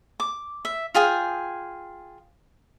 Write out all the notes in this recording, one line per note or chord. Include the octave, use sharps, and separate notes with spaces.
D6
E5
F4 G#4 G5 G#5